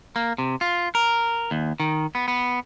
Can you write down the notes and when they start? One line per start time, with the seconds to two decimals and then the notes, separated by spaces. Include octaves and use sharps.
0.16 A#3
0.38 C3
0.61 F4
0.95 A#4
1.51 D#2
1.80 D#3
2.15 B3
2.28 B3